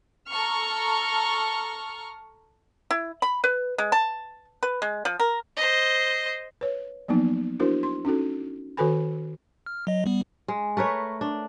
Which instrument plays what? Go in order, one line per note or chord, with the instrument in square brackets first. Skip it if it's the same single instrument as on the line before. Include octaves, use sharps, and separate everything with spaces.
[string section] A4 A#5 C#6 F6
[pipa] E4
B5
B4
G#3
A5
B4
G#3
F3
A#4
[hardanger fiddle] C5 D#5
[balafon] B4 C#5
F3 F#3 A#3 B3 D#4
D4 E4 F#4 A#4 C5
C6
C#4 D#4 F#4 A4
D#3 F#4 A4 B4 G#5 B5
[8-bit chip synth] F6
F#3 D#5
G3 B3
[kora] G#3
A3 A#4 B4 C#5
D4